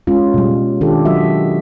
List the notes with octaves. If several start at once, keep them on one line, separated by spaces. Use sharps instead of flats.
G#3 C#4 F4
B2 G3
D#3 D4 F4 G4 A4
F#3 F#4 D#5 E5